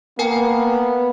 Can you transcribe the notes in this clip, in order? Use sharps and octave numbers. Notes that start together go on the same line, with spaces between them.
A#3 B3 A#4 G5 G#5